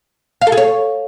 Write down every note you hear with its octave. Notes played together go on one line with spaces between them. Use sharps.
F5
A4
G#4
C#5